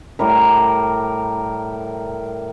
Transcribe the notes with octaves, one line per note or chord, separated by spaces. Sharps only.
A2 G3 A#4